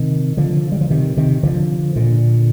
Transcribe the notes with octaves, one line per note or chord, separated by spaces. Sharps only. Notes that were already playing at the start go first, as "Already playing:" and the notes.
Already playing: C3 D#3
D3 F3
G3
F3
C3 D#3
C3 D#3
D3 F3
A#2 D3